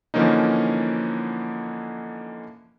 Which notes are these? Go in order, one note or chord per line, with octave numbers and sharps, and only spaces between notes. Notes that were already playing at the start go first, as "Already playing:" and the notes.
D3 E3 F3 A#3 C#4 D#4